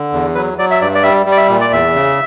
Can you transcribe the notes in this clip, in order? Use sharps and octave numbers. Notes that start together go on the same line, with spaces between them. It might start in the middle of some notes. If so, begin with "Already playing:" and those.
Already playing: D3
E2
F#3 B4
F#3 D5
E5
G2 D5
D5
G3 E5
G3
D5
E5
A#2
D5
E2 E5
C#3